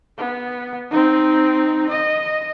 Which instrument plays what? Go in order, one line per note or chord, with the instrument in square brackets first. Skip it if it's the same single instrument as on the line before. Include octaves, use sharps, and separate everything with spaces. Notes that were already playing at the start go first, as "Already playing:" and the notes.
[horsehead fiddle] B3
C4 D#4
D#5